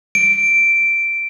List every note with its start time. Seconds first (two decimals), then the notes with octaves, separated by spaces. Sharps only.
0.15 D7